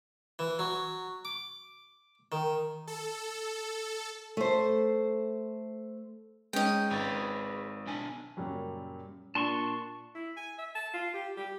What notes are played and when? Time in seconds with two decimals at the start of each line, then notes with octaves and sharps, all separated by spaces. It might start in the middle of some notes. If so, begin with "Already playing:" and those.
0.39 E3
0.59 F#3
1.25 D6
2.32 D#3
2.87 A4
4.37 A3 C5
6.53 G#3 C#4 D#4 D#5 G5
6.91 G#1 G#4 B4 C#5 A6
7.87 B1 D4 G#5
8.37 F#2 A#2 C#3 F#3 G3
9.35 A#2 D4 A5 C6 C#6
10.15 E4
10.37 G#5
10.58 E5
10.75 A5
10.94 F4
11.14 G4
11.37 G4